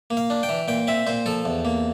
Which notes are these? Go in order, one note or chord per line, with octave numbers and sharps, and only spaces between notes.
A#3
F5
D4
G5
E3
A#2 G5
C4 E5
A#2 C5
F3 A4
E2
A#3